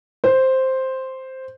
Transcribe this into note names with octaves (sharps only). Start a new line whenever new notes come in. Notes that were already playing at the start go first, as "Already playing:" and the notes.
C5